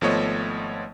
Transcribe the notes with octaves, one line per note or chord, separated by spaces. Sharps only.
G#1 F3 A3 B3 C#5 D#5